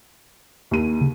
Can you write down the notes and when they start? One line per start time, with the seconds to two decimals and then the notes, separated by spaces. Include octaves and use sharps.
0.71 D#2 D#7
1.01 C#3